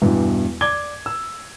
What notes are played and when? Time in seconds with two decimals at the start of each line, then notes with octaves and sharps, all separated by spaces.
0.02 E2 G2 B2 E3
0.61 D5 D6 G#6 G7
1.06 E6